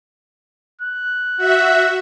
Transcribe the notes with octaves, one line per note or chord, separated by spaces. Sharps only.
F#6
F#4 E5